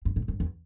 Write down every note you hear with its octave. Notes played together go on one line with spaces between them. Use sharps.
G2
A2
G2
E2